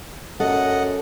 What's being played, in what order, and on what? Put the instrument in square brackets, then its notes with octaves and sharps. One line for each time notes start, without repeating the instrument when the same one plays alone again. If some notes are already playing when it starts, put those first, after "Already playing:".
[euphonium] F#2 [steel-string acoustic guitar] A4 [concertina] D#5 F#5